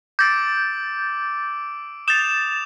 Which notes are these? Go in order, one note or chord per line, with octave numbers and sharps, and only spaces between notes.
D6 E6 G6 A6 D7
D#6 G6 A6 E7 F7